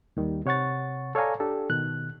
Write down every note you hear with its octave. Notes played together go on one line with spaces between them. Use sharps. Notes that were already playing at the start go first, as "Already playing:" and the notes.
D#2 D#3 G3
C3 C#5 F#5 C#6 A6
A4 C#5 D5 F5 G#5 A#5
D4 G4 A4
B2 D#3 F#6